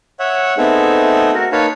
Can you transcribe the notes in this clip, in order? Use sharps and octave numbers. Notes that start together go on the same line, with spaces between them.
C#5 E5 F#5
A3 B3 C4 D#4 G#4 E5
F#4 A#4
A#3 D#4 B4 C#5 F5 A5